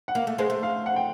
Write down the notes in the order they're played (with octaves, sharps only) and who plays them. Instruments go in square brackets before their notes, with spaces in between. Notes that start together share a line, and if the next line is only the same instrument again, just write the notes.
[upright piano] F#5
[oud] A#3 [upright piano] F5
[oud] A3
[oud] G#3 [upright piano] C5
[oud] A3
[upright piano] F5
F#5
G5